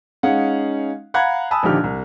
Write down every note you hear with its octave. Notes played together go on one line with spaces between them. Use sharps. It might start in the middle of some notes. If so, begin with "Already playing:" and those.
G#3 C#4 D#4 F5 F#5
F5 F#5 A#5 B5 F#6 G#6
G#5 A5 B5 D#6 E6
A#1 D3 D#3 F3 G4 F6
C2